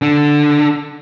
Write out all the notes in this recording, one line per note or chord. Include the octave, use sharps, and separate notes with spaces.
D3 D4